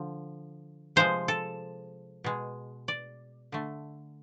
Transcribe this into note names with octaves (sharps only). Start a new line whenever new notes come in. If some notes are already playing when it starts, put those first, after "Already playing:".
Already playing: D3 F3
C3 F3 G#3 C5
A4
B2 G#3
D5
D3 A3